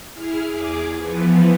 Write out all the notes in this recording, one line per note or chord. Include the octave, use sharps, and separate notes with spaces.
E4 G#4 F6
E2 G#4 D6
E3 F3 B3